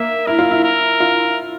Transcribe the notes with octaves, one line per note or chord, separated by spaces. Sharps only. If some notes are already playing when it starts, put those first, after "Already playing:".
Already playing: A#3 E5
E4 A#4
F4
E4
A#4
F4